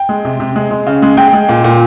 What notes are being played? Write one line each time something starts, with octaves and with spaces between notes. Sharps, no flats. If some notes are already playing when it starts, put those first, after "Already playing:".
Already playing: G5
G#3
C3
C3
G#3
G#3
C#3
G#3
G#3 G5
G#3
A#2
A#2